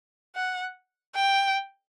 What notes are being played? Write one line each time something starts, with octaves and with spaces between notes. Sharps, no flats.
F#5
G5